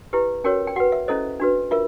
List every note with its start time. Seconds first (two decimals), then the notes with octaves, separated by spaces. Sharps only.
0.13 E4 G4 B4
0.44 C#4 F#4 A#4 C#5 G5
0.67 G5
0.76 F#4 B4 F#5
0.92 E5
1.08 C#4 E4 A4 C5 D#5
1.40 D4 F#4 B4
1.71 F4 A#4 E5